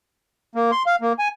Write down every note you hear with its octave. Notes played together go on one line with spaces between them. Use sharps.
A#3
C6
F5
A#3
G#5